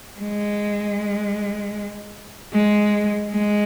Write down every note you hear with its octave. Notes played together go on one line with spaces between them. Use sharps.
G#3
G#3
G#3